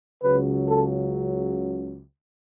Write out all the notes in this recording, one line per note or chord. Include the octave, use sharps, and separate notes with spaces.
C#2 C#3 F#3 B4
A4